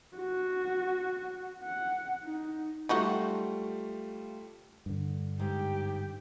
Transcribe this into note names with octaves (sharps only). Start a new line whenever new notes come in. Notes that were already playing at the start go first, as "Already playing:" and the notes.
F#4
F#5
D#4
F#3 G3 A3 D#4 F4 F#4
G2 D3
G#2 G4